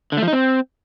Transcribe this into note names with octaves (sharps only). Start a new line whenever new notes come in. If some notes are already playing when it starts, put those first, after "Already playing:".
D3
A3
F3
D#4
C4